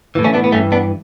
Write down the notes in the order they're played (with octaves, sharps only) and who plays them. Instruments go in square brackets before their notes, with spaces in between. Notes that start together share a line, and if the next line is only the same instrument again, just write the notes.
[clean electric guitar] A2 E3
A3 C#4
B3 D4
B3
G2 E3 A3 C#4
B3 D4